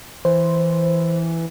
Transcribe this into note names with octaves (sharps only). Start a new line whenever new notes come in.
E3 C5